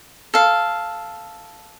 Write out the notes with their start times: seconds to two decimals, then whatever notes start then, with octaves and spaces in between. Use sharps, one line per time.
0.34 A4 F5